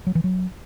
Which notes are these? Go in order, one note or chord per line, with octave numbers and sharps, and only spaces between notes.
F#3
E3
F#3